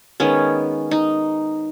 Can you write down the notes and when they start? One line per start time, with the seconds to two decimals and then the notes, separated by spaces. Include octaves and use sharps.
0.20 D#3 G#3 B3 C#4
0.91 D#4